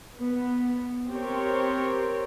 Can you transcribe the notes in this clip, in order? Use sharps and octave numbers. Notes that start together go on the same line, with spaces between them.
B3
C4 G4 A#4 C#5